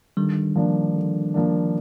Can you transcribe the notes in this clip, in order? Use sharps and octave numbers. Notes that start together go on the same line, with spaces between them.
D3 D#3 G3
F3 A#3 D4
D3
F3 A#3 D4